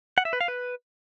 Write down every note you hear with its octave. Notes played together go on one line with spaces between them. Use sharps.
F#5
E5
B4
F5
B4